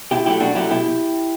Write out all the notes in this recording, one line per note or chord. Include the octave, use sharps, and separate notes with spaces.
B2 E4 G4
F#3 A3 E4 G4
B2 D4 F#4
F#3 A3 E4 G4
B2 E4 G4